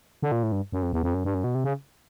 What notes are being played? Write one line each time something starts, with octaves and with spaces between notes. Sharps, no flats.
D3
A#2
A2
G2
F#2
F2
E2
F2
F#2
G2
F#2
B2
C3
C#3